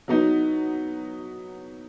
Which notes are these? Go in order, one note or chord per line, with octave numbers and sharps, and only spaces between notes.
F#3 B3 D#4